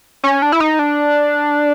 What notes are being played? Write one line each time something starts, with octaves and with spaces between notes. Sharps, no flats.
C#4
D4
E4
D#4
D4